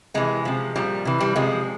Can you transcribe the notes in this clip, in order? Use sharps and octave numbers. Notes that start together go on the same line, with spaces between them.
C3 E3 G#3
C3 F3
A#2 F3 G3
C3 E3
G3
C3 F3 G#3